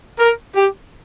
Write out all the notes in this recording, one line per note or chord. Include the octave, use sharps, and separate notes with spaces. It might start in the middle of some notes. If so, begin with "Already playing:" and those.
A#4
G4